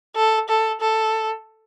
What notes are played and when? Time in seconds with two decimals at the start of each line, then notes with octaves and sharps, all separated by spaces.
0.16 A4
0.49 A4
0.81 A4